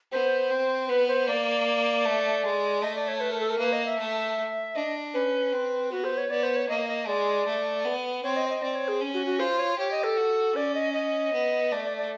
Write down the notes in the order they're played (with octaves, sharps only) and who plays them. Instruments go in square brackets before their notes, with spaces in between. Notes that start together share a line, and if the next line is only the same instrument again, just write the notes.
[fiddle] B3 [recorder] C5
[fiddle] C4
[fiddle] B3 [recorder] B4
[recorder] C5
[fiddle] A#3 [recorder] D5
[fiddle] A3
G#3
[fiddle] A3 [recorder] D#5
[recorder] D5
C#5
B4
A#4
A4
A#4
[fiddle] A#3 [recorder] B4
[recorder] D#5
E5
[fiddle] A3
[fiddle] D4 [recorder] D#5
[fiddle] C#4 [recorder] B4
[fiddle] C4
[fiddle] B3 [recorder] F#4
[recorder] C5
C#5
[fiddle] B3 [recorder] D5
[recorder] C5
C#5
[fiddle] A#3 [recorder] D#5
[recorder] D#5
[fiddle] G#3 [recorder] D5
[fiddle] A3
B3
[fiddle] C4 [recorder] C#5
[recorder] D#5
D#5
[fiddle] C4 [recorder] D5
[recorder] C#5
G#4
[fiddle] C#4
[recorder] F#4
F#4
[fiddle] F4 [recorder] C5
[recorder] C#5
[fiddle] G4 [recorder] C#5
[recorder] D#5
A4
[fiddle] F#4
[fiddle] C#4 [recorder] D5
[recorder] D#5
D#5
[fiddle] B3
[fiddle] A3 [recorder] D5
[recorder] D5
D5